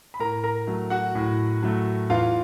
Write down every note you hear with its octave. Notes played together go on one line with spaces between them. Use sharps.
B5
A2 A#4 A#5
A#4 A#5
F#3 A3
F#4 F#5
A2
F#3 A3
E2 F4 F5